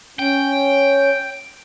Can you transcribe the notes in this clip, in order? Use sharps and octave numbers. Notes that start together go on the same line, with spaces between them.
C#4 G5